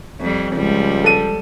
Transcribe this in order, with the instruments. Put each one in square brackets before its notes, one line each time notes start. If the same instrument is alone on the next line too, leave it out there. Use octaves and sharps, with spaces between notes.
[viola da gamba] F2 G3
[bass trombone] C#2 [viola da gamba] F3 G3 G#3
[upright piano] A4 D#7